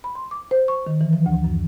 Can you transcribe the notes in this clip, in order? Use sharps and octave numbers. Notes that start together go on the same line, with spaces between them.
B5
C6
D6
C5
C#6
D#3
E3
F3
D2
F#2